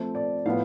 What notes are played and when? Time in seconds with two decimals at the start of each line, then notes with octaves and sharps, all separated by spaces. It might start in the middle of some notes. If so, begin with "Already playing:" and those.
Already playing: F3 A3 C4
0.15 D5
0.46 A2 F3 B3 F5